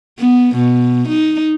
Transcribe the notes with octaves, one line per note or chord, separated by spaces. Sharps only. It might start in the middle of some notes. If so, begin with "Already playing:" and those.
B3
B2
D#4